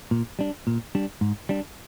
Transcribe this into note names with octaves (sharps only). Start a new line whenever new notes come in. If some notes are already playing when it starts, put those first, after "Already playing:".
A#2
G3 D4
A#2
G3 D4
G#2
G3 D4